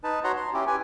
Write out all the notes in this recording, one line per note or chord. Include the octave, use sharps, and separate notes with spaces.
D#4 B4 A5
F#4 C#5 F#5 A#5 C6
C6
C#4 E4 G4
G4 B4 G#5